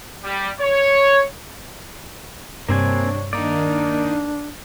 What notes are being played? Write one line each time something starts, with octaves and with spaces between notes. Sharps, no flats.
G3
C#5
G2 C3 A#3 C4 D4 C#5 G#5
D#3 A#3 D4 D#4 D5